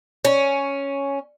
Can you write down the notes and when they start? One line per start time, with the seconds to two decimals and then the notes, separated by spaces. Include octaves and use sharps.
0.25 C#4